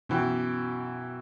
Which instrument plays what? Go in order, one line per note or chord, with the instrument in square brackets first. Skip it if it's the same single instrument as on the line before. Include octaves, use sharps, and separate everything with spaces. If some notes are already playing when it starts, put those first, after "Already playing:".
[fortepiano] F#2 E3 G5 [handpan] B2 F#4